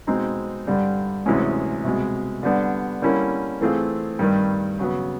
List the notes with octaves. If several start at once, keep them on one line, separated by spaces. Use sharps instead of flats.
B2 G#3 C4 D#4
G2 D3 G3
D2 C3 E3 G#3 C#4
C2 B2 G#3
D3 G3 B3 D4
D3 G3 A#3 C#4 E4
E3 A3 C4 F4 G#4
G2 D#3 G3
C#3 F#3 B3